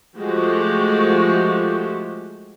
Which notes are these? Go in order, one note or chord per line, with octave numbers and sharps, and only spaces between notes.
F3 G#3 A3 F#4 G4